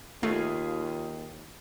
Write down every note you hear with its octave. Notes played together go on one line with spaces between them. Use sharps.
D#2 A3 F4 G#4